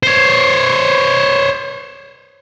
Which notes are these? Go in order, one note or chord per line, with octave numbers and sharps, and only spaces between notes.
C5 C#5